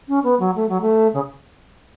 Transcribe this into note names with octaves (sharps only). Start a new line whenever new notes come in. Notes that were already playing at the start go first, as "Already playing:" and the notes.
C#4
B3
F#3
A3
F#3
A3
C#3